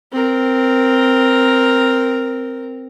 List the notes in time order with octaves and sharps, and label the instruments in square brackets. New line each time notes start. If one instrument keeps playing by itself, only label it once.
[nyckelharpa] C4 A#4